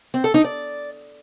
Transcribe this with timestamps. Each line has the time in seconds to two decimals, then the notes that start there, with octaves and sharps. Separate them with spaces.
0.14 C4
0.24 A4
0.34 D#4
0.44 D5